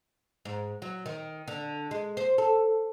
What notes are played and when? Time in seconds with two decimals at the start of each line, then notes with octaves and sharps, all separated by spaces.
0.45 G#2
0.82 F#3
1.06 D#3
1.48 D3
1.91 G#3
2.17 C5
2.38 A4